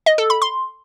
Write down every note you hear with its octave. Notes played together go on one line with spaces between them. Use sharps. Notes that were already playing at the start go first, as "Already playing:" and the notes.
D#5
A4
B5
C6